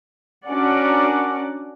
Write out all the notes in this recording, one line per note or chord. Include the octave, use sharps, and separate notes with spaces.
C#4 D4 F#4 A#4 D5 F#5